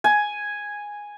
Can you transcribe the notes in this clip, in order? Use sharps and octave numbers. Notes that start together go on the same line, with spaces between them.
G#5